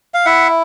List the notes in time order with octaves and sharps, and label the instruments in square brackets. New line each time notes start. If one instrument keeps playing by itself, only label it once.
[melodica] F5
E4 E5 F#5